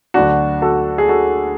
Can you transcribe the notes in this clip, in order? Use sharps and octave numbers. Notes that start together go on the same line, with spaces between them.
D2 D3 F#3 D4 F#4
F#4 A4
G#4
F#4 A4